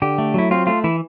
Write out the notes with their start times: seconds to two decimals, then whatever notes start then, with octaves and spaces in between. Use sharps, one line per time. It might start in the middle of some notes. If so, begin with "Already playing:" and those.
0.02 D3 G4
0.18 A3
0.34 F#3 E4
0.51 C4 F4
0.67 A3 F4
0.84 E3 E4